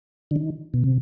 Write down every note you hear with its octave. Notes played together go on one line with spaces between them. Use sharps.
D3
D#3
B2
C3